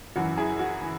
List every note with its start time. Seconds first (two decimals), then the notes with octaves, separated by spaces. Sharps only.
0.16 F#2 E3 F#4
0.37 E4 G#4
0.59 F#4
0.81 E3